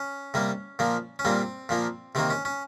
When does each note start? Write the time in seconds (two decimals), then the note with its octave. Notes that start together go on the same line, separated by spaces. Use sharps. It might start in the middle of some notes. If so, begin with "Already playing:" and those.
Already playing: C#4
0.34 C3 G3 A#3
0.79 A#2 F3 A#3
1.19 C#4
1.25 A#2 G3 A#3 C4
1.69 A#2 F3 A#3
2.15 C3 D#3 A#3 C4
2.30 C#4
2.45 C#4